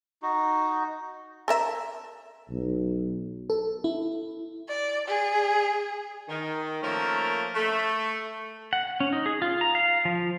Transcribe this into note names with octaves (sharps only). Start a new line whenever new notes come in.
D#4 F#4
A4 A#4 E5
B1
A4
E4
D5
G#4
D#3
F3 A3 A#3 C#4 A#4
A3
F#5
C#4
D#4
G#4
F4
A#5
F5
F3